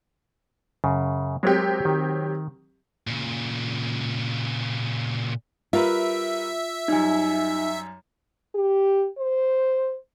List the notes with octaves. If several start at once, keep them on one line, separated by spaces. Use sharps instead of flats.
F#2 C#3
F#3 G#3 C4 G4 A#4 C#5
D#3
A#2 C#3
G3 F4 A#4 B4 E5
F#2 G3 D#4 G#5
G4
C5